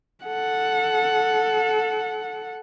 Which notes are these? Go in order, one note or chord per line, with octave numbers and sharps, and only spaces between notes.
A4 F#5